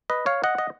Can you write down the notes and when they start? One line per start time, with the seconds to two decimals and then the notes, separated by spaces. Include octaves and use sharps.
0.10 B4 D#5
0.26 C#5 F5
0.44 D#5 F#5
0.58 D#5